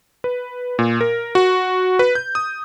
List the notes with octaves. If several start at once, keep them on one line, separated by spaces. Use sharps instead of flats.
B4
A#2
A#4
F#4
B4
G6
D#6